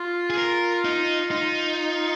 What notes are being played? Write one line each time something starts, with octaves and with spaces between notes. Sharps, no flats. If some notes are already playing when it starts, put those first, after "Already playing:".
Already playing: F4
G#4
A#4
D#4
D#4 F4